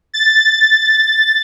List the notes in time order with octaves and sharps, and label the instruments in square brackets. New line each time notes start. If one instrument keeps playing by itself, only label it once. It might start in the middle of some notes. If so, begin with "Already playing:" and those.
[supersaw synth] A6